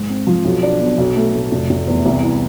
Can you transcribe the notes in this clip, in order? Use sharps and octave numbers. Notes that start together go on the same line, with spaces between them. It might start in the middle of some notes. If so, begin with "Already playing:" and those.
Already playing: G#2
C4
F3
B1
D4
B2
B1
A3
A2
F1
F1
E2
C2
E4